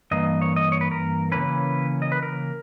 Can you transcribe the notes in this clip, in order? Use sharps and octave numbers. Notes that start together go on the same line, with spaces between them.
G2 E3 A#3 D#5
C#5
D#5
C#5
B4
A#4
C#3 E3 A#3 C#4 B4
D#5
B4
A#4